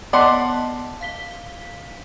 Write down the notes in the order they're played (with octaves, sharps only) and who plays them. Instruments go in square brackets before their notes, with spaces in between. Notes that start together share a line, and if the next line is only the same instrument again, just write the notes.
[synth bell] B3 D#5 A5 [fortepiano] D5 F#5 C6
[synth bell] F5 B6 G7